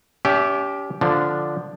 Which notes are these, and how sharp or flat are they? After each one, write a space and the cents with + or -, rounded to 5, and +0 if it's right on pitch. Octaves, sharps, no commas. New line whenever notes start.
C#4 +45 G4 +0 E5 +0
D3 +0 F3 +0 D4 +0